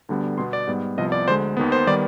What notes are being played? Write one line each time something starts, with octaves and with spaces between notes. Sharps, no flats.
D2 D3 G3 B3
B2 B3 C6
D5
G#2 G3 B3
C2 C3 F3 B3 D#5
D5
D2 D3 G#3 C5
D#2 D#3 B3
C5
D#3 G3 B3 D5